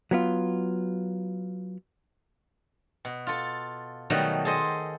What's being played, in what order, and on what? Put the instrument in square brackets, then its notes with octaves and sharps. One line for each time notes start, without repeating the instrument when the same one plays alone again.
[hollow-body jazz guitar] F#3 B3 F4
[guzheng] B2
F4 A4
B2 D#3 F#3 G3 A3
G#4 A4 C5 D#5